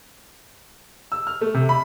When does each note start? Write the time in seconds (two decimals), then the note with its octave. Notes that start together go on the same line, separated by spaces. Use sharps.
1.12 E6
1.27 F6
1.41 A3
1.54 C3
1.69 B5